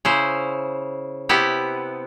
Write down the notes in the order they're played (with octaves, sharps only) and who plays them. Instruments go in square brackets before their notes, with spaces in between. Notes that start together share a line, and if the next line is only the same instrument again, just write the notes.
[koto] C#3 E4 C5
C3 B3 E4 G4